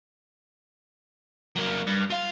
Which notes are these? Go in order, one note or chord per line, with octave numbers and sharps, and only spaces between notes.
F#3 A#3
G2
F4 F5